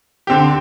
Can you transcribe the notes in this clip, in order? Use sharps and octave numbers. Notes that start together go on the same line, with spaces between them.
D3 C4 G4